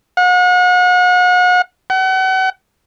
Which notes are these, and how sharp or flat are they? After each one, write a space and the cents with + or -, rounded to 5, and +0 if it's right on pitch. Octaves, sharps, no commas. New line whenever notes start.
F#5 -40
F#5 +35